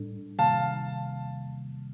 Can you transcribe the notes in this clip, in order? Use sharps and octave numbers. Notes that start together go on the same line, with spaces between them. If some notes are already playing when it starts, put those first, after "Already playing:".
Already playing: A2 G3 D4 A4
C3 D#3 G3 A#3 F5 A5